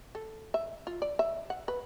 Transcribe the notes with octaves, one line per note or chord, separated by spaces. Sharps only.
A4
E5
F4
D5
E5
F#5
B4